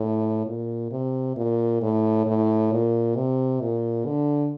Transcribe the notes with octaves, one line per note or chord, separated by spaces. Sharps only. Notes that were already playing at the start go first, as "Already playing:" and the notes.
Already playing: A2
A#2
C3
A#2
A2
A2
A#2
C3
A#2
D3